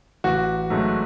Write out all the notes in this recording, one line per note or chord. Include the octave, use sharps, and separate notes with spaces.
A1 F#4
G#2 F#3 A3